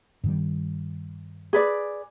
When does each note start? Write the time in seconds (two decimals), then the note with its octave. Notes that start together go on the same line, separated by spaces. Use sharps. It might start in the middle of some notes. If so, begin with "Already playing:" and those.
0.24 G2 D#3 G3
1.53 G#4 B4 D5